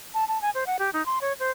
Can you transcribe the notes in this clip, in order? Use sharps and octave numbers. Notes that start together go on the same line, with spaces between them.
A5
A5
G#5
C5
F#5
G4
D#4
C6
C#5
C5